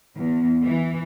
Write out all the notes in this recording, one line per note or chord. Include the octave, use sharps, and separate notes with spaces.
E2
E3